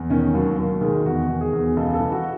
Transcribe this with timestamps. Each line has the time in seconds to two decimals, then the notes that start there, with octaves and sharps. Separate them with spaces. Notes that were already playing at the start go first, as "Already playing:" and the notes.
Already playing: E2
0.10 D#3 C#4
0.34 D#2 F#3
0.58 D#2 F#3
0.81 D#3 G#3
1.05 E2 F#4
1.29 D#3
1.41 G#4
1.53 E2
1.76 C#2 A4
1.94 A4
1.99 E3
2.12 F#4